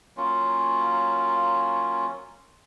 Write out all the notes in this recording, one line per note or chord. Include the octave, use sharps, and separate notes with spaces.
F#3 A#3 C#4 F4